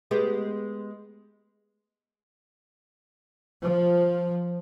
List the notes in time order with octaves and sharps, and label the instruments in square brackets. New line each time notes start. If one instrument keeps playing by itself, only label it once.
[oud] G#3 B3 G4
[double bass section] F3